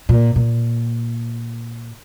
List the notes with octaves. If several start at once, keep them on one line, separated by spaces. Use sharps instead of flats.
A#2
A#2